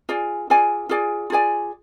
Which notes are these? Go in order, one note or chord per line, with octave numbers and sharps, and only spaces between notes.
F4 G#4 D5 G#5
F4 G#4 D5 G#5
F4 G#4 D5 G#5
F4 G#4 D5 G#5